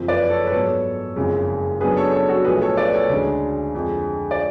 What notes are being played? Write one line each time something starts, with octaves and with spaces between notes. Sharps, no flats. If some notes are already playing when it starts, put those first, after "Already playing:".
Already playing: F#1 F2 F3
B4 D5
A4 C#5
B4
G#2 F#3 B3 A4 C#5
F#1 F2 C#3 G#3
F#2 C#3 F#3 B3 D4 G#4 B4
A4 C#5
A4 C#5
F#4 A4
B1 A2 F3 A3 G#4 B4
A4 C#5
B4 D5
A4 C#5
D2 C#3 G#3 D4
F2 D3 G#3
D5